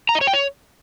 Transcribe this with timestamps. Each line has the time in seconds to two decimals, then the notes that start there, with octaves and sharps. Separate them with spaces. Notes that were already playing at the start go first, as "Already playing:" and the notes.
0.09 A#5
0.15 D#5
0.21 C#5
0.27 G5
0.33 C#5